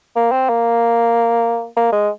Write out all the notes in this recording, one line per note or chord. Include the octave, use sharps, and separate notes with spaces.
A#3
C4
A#3
A#3
G#3